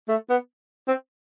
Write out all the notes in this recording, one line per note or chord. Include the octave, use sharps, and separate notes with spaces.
A3
B3
C4